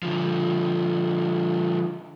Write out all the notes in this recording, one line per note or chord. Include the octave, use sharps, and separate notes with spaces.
D3 F3